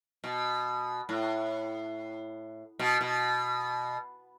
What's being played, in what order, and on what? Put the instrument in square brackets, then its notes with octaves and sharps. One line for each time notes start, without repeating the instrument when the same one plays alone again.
[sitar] B2
A2
B2
B2